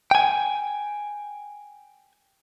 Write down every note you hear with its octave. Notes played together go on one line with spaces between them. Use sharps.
G5 G#5